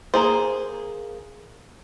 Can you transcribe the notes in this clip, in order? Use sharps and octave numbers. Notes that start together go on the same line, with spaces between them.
A#3 G#4 C5